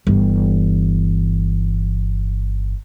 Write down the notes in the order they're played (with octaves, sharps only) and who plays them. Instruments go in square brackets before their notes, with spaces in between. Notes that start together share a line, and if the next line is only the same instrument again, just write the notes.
[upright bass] G1 E3